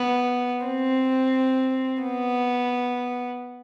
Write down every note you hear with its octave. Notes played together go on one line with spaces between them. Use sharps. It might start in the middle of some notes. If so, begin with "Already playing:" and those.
Already playing: B3
C4
B3